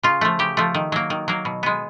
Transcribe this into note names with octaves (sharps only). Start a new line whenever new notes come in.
C#3 F4
F3 A3
C#3 G4
F3 A3
D#3
F#3 A#3
D#3
F#3 A#3
B2
G#3 B3